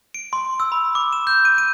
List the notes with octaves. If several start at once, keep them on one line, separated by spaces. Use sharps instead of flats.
D7
C6
E6
B5
D6
E7
G6
D#7
D#7